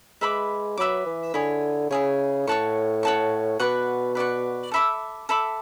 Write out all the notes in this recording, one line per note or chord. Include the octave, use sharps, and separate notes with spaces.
G#3 B4 E5 B5 D6
F#3 B4 E5 B5 D6
E3
D3 E4 G#4 C#5
C#3 E4 G#4 C#5
A2 C#5 F#5 A5 C#6
C#5 F#5 A5 C#6
B2 B4 D5 F#5 C#6
B4 D5 F#5 C#6
A4 E5 B5 D6
A4 E5 B5 D6